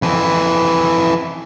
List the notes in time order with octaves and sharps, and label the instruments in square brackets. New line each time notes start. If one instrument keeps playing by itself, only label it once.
[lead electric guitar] F2 E3